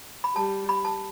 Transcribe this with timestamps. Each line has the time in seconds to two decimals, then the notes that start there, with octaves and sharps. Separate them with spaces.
0.24 B5
0.35 G3 A5
0.69 B5
0.85 A5